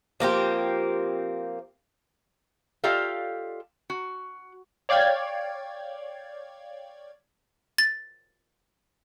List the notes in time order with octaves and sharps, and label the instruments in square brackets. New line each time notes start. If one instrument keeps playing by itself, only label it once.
[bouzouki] F3 A#3 C4 G4
[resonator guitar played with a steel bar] F4 G4 A4 D5 D#5 F5
F#4
[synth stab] C#5 D5 F5 G5 G#6
[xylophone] A6